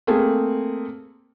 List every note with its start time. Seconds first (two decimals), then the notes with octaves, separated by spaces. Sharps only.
0.07 A3 A#3 C4 G#4